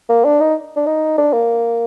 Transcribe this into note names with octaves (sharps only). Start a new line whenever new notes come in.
A#3
D4
D#4
D4
D#4
D4
A#3